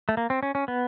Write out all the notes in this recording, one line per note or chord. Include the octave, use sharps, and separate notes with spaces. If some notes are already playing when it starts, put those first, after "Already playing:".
A3
A#3
C4
C#4
C#4
B3